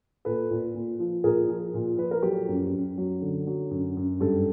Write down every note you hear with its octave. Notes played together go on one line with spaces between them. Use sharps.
A#2 A4 B4
A#2
A#2
F3
A#2 G#4 A#4
F3
A#2
F3 B4
A#4
F#3 G4 A4
F#2
F#2
F#3
D3
F#3
F#2
F#2
G2 G4 A4